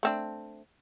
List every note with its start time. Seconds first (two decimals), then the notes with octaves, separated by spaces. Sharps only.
0.03 A3 C4 D4